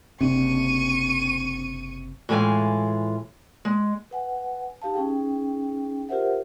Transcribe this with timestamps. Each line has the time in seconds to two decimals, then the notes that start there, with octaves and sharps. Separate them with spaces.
0.21 F#1 C3 C4 D4 C#6 D#7
2.29 A2 E3 G#3 F4 G#5
3.65 G#3
4.11 B4 F#5 G#5
4.82 D#4 G4 F5 A5
4.94 C#4 D#4 G#4 G5
6.09 F4 G4 A#4 C5 E5 F#5